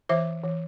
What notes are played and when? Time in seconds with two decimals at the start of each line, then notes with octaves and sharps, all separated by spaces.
0.09 E3 C5 E5
0.44 E3